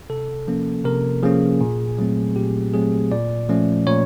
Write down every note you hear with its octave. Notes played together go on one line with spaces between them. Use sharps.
C3 A4
F3 A#3 C#4
C3 A#4
F3 A#3 C#4 G#4
A#2
F#3 A3 C4
A#2 G4
F#3 A3 C4 G#4
A#2 D5
F3 A3 C#4
A#2 C#5